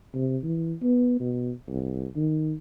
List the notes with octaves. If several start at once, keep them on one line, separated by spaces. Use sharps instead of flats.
C3
E3
B3
B2
C2
D#3